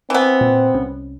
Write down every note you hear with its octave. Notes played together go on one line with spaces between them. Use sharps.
E3 B3 C4
A#2
C2 C#4